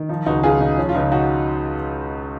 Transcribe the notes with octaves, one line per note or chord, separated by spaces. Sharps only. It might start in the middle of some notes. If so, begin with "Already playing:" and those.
Already playing: D#3
F3 D#4
C#2 D#4 F#4
C#2 F4 G#4
C#3 D#4
F3 C#4
F4
C#2 D#4
D#4 F#4